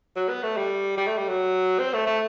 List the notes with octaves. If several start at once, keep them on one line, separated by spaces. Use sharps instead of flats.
F#3
B3
A3
G3
G3
A3
G3
F#3
C4
A3
A3